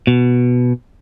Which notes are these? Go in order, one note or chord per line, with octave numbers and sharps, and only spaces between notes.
B2